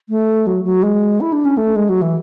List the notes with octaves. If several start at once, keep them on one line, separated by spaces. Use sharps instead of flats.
A3
F#3
F#3
G#3
E4
D4
C#4
A3
G#3
F#3
E3